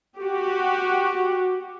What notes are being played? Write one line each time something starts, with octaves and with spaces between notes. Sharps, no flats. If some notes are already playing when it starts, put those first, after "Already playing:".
F#4 G4